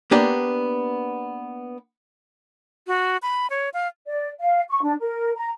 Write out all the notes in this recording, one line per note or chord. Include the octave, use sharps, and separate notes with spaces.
A#3 B3 D4 G4 D5
F#4
B5
C#5
F5
D5
F5
C#6
D4
A#4
A#5